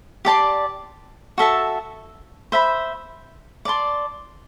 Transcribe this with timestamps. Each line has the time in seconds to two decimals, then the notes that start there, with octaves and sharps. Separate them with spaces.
0.25 G4 D5 A5 C6
1.38 F#4 A4 E5 A5
2.52 C5 E5 B5
3.65 D5 A5 C6